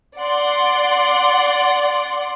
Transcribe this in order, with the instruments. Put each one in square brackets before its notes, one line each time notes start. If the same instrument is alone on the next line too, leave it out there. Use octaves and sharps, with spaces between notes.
[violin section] D5 F#5 C6